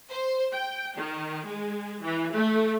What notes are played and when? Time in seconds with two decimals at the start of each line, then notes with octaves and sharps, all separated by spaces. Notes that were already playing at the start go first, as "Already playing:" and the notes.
0.10 C5
0.53 G5
0.96 D#3
1.45 G#3
2.01 E3
2.34 A3